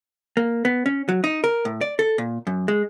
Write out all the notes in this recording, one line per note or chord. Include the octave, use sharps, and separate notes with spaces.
A#3
B3
C#4
F#3
D#4
A#4
A2
D5
A4
A#2
F#2
G#3